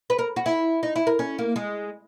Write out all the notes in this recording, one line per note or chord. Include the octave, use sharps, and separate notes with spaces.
B4
A#4
F#4
E4
D#4
E4
A#4
C#4
A#3
G#3